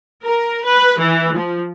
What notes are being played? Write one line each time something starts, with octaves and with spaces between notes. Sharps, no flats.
A#4
B4
E3
F3